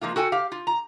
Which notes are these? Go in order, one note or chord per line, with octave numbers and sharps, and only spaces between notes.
F3 G#3 A#3 F4
F#4 A4 G5 G#5
G4 F5
F4
A#5